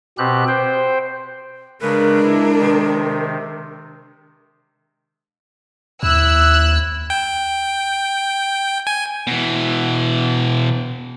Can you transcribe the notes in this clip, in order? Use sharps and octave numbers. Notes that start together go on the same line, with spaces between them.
B2 C4 G4 F#6
C5 G5
C#3 G#3 D4 A#4 B4
E4
C3 D#3
D#2 E4 E6 F#6
G5
G#5
B2 E3